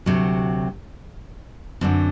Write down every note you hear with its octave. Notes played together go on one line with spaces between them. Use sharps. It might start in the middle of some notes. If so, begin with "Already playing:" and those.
D2 C3 F#3
F#2 D3 F#3 C4